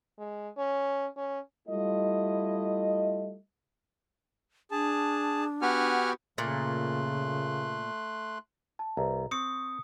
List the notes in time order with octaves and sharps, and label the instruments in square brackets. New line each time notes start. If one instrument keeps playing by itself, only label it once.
[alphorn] G#3
C#4
C#4
[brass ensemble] G3 A3 E4 F4 D#5
[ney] D4 [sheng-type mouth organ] G#4 A5
[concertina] B3 F#4 G4 [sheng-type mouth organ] F#5 G#5 F6
[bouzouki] A#2 [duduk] C#3 [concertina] A3 C6 F#6
[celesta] A5
[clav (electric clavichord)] C2 [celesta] G#4 B4 A#5
[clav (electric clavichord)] C4 [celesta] C#6 [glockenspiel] D#6 C#7